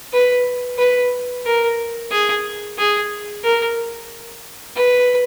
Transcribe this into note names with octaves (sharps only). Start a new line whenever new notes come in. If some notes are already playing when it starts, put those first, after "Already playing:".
B4
B4
A#4
G#4
G#4
A#4
B4